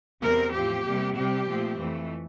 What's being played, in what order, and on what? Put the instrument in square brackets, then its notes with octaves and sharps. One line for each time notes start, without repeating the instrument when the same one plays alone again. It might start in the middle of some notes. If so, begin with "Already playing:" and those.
[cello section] E2 C3 G3 C4 A#4
A2 F3 C4 G4
C3 G3 A#3
C3 G3 C4 G4
A#2 F3 A3 C4
F2 E3 A3